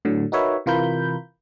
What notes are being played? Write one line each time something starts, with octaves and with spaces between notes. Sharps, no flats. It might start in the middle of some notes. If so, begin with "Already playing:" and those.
A2 D3 F#3
D#4 F#4 A#4 B4 C#5 E5
C3 E3 F4 A#4 B5 G6